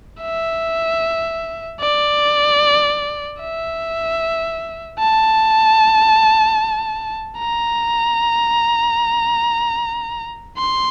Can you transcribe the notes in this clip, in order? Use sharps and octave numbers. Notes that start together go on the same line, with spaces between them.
E5
D5
E5
A5
A#5
C6